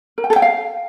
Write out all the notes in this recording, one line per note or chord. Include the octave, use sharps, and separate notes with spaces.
A#4
G5
A4
G5
F5